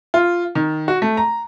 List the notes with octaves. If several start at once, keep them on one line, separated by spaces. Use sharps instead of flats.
F4
D#3
F#4
A3
A#5